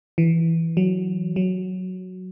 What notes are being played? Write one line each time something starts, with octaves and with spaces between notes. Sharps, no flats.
E3
F#3
F#3